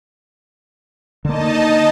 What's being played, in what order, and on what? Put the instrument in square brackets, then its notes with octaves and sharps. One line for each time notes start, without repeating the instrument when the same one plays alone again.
[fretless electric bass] D3 A#3 [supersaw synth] D#4 D#5 A5